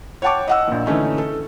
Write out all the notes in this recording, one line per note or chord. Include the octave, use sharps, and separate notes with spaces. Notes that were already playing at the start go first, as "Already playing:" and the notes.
C#5 F#5 G5 A5 C#6 D6
D#5 F#5 E6
A#1 A#2
D3 E3 A3 C#4 D#4
A4